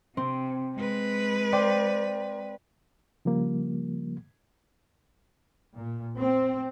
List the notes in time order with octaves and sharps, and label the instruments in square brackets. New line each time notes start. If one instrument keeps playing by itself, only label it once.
[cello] C3 [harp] C4
[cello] G#3 B4
[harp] C5 D5 G5
[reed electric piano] C#3 F3 G3 A#3
[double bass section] A#2
C4